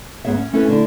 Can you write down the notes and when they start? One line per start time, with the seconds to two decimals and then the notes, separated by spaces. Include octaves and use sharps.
0.25 D2 G#2 B3 G#4 C#5 E5
0.37 C#4
0.53 A3 C#4 E4 A4 B4
0.68 D3 E4